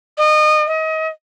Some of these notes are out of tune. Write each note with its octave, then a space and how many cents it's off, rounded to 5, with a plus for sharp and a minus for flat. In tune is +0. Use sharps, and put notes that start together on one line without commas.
D#5 -25
D#5 +30